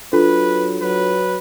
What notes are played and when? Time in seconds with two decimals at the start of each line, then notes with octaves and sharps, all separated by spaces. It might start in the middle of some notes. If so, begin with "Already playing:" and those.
0.13 F#3 D4 F4 A4 B4
0.81 F#3 B4